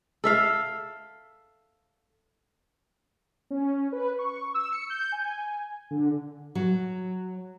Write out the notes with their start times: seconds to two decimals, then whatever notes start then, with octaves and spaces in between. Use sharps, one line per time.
0.24 A4 E5 F5
3.50 C#4
3.92 B4
4.19 C#6
4.54 E6
4.72 C#7
4.90 G6
5.12 G#5
5.91 D3
6.55 F#3